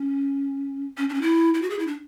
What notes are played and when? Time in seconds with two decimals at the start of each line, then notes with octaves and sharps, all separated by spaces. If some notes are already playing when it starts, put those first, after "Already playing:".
Already playing: C#4
0.97 C#4
1.09 D4
1.14 C#4
1.22 E4
1.54 E4
1.62 F#4
1.70 G#4
1.79 E4
1.87 D4